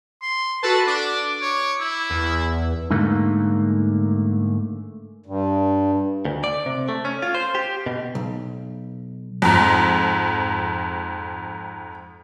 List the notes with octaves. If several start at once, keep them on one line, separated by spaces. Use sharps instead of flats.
C6
F#4 A4 B4 A5
D4 D6
C#5
E4
E2
G#2 D3 A3 A#3
G2
D2
D5
C3
A3
C#4
F4
C5
G4
B2
B1
F2 G#2